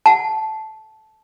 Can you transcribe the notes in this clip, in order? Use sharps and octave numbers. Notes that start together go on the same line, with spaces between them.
F#5 A5